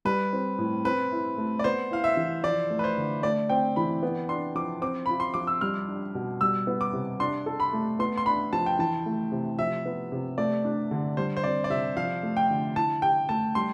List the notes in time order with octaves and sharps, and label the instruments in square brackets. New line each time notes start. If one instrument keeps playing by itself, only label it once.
[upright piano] G3 [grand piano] B4
[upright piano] C4
A2
[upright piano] C4 [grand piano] B4
[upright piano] E4
A3
[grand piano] D5
[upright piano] B3 [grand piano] C5
[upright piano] E4 [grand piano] F5
[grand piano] E5
[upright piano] E3
[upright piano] F3 [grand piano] D5
[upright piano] A3
[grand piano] B4
C5
[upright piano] D3
[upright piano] A3 [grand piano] D5
[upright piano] C4 [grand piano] G5
[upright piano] E3 [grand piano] B5
[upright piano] B3
[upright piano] D4 [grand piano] C6
[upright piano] F3 [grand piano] D6
[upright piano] C4 [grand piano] D6
[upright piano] F4 [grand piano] B5
[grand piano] C6
[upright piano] F3 [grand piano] D6
[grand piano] E6
[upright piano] G3 [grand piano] F6
[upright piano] D4
B2
[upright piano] G3 [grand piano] E6
[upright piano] B3
[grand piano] D6
[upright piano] C3
[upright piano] D4 [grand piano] C6
[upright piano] A4
[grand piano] B5
[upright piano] A3
[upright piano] B3 [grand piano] C6
[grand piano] C6
[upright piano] D4 [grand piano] B5
[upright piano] F3 [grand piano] A5
[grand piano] G5
[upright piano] E3 [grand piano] A5
[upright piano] A3
C3
[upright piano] F3 [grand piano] E5
[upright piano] B3
C3
[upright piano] A3 [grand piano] D5
[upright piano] D4
D3
[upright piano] G3 [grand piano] C5
[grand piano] C5
[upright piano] C4 [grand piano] D5
[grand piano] D5
[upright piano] C3 [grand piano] E5
[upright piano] F3 [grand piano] F5
[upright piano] A3
[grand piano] G5
[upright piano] D3
[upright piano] E4 [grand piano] A5
[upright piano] G4 [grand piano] G5
[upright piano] A3 [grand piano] A5
[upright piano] G3 [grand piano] C6